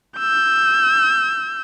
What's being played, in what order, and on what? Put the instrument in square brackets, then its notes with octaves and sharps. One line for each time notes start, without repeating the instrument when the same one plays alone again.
[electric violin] E6 G6